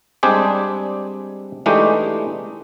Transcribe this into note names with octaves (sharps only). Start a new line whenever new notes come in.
G3 G#3 C4 D4 G4 G#4
E3 G#3 A3 D4 D#4 G4